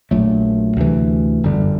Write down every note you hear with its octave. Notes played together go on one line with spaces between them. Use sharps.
A#1 A#2 F#3 A3
D2 C3 E3 A3
G1 F#2 D3 G3